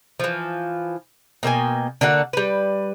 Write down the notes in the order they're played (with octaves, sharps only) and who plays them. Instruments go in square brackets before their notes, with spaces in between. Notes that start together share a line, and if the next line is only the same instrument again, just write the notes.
[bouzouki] E3 F3
B2 A#3 G5 G#5
D3 A#3 F#4 F#5
G3 B4